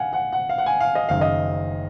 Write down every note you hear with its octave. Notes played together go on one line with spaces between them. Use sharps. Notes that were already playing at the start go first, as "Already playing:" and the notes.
Already playing: F5 F#5 G#5
F#5
F#5
F5
F#5
G#5
F5
D#5
F#1 F#2 D#3 F5
D#5